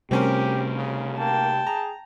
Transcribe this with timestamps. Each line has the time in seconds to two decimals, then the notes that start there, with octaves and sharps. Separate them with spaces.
0.11 C3 G3 A3 C4 C#4 G4 A#4
0.76 C#3
1.19 A#3 G5 A5
1.67 G#4 A#5